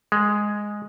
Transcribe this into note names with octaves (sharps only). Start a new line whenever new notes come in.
G#3